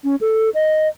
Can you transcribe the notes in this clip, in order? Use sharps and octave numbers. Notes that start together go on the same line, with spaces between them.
C#4
A4
D#5